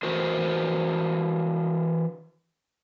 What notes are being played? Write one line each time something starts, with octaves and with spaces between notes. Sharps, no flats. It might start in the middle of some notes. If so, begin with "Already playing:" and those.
E3 F#4 A#4 C5